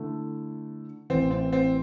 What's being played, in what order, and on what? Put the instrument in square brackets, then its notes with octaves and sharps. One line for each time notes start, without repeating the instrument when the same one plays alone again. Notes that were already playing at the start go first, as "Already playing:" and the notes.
Already playing: [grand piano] D3 A3 E4
[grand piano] A1 A2 E3 [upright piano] C4
[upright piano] C4
C4